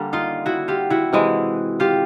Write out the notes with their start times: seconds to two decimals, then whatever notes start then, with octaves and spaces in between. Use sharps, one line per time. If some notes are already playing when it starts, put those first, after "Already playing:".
Already playing: D3 G3 A#3
0.13 D#4 F4
0.46 E4 F#4
0.68 F4 G4
0.90 E4 F#4
1.13 C3 E3 G#3
1.80 F4 G4